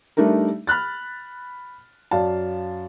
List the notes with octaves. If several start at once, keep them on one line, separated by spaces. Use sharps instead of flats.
G3 A3 D4 D#4 A#4
B5 F6 F#6 A6
F#2 D5 F5 A5